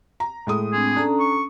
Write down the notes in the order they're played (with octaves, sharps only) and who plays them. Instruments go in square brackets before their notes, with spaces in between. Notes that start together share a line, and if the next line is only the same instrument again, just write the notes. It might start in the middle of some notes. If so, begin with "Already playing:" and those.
[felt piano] A#5
A2 G#3 D#6
[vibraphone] C4 D4 [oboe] G#4
[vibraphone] C#4 A4 A#5 [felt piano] D4
[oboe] C#6